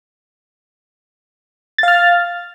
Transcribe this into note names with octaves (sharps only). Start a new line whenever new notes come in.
F5 F6 A6